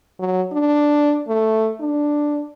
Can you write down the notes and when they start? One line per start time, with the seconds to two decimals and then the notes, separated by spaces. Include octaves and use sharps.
0.19 F#3
0.52 D4
1.28 A3
1.80 D4